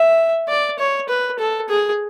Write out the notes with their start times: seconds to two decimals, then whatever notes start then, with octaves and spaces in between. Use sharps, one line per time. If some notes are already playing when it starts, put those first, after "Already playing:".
Already playing: E5
0.49 D5
0.79 C#5
1.09 B4
1.39 A4
1.69 G#4